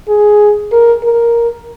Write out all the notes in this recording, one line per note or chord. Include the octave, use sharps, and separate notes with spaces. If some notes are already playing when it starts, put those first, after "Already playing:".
G#4
A#4
A#4